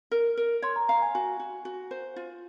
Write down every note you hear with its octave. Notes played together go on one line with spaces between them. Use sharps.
A#4
A#4
C#5 C6
A#5
F5 A#5
G#5
F#4 G#5
F#4
F#4
C5
F4